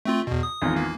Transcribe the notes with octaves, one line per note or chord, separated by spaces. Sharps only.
A3 C4 F4
E2 B2
D#6
G#1 E2 F4
A#3